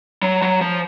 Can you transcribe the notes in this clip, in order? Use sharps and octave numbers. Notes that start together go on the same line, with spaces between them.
F#3
F#3
F3